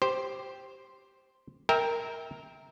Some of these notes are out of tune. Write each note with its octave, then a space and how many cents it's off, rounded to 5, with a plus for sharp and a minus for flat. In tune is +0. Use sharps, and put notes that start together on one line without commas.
G4 +0 C5 +0
A#4 +0 E5 -25 G5 +15